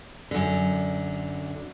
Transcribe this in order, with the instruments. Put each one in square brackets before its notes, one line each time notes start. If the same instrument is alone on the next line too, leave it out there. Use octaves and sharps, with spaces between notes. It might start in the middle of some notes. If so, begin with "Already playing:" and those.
[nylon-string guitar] F#2 D3